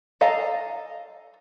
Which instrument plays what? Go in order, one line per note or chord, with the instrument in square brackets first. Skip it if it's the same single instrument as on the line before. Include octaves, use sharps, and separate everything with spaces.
[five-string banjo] A4 D#5 F5 A#5